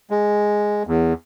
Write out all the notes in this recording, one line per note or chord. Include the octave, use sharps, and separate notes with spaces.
G#3
E2